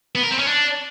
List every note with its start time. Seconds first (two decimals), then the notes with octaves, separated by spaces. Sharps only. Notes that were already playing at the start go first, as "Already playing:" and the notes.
0.15 B3
0.23 A#4
0.31 C4
0.39 C#4
0.47 D4